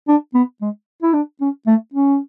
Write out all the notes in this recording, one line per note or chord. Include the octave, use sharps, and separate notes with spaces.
D4
B3
G#3
E4
D4
C#4
A3
C#4